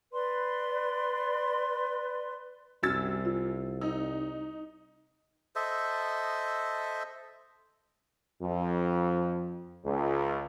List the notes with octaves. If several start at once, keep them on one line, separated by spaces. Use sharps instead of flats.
B4 D5 C6
C2 F#2 F#4 E6 F6 A6
F4
D#4 E6
A4 C5 D#5 E5
F2
C#2